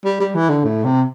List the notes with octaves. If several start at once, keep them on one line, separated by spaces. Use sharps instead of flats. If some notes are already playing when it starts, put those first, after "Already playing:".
G3
G3
E3
D3
A2
C3